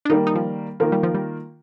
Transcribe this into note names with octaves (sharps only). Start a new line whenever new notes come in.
D4
D#3 G3 A#3 D#4
D#4
F3
D#3 F3 A#3 F4 A#4
G3
F3
G3